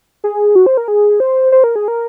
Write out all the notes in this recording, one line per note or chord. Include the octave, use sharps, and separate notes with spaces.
G#4
F#4
C5
A#4
G#4
C5
C5
A#4
G#4
A#4